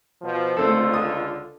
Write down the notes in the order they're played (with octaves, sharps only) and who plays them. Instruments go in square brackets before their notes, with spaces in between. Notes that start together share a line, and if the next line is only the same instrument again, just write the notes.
[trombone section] B2 F3
[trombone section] C#2 D3 F4 [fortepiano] A3 C4 A4
[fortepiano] D#6